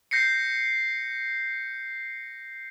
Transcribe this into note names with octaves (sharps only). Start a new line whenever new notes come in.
G6 A#6 C7 C#7